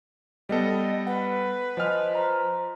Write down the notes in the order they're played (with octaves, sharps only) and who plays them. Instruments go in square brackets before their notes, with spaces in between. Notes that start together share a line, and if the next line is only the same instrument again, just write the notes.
[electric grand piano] G3 B3 A4 [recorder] D#5
[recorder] B4 [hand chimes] F#5
[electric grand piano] F3 F6 [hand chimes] C5 D#5 G#5
[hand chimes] C5 A#5